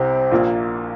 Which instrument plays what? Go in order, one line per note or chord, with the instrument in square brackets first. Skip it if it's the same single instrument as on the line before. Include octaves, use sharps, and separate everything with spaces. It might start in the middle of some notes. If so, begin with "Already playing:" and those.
Already playing: [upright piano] C2 C3 G4 [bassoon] C4
[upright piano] A#1 A#2 A#3